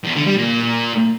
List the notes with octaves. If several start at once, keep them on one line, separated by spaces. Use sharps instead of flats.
E2
D3
G3
A#2